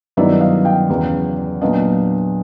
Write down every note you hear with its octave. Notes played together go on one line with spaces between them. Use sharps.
G2 D#3 F#3 B3 E4 D5 E5
D#5 F5
F5 G5
E2 C#3 F#3 B3
A#2 F#3 B3 D4 D#5 F5